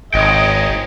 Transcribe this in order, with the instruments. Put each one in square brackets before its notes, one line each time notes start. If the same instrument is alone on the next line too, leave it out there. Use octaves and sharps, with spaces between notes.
[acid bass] G#1 [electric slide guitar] D#4 C#5 G5 [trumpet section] G#4 D#5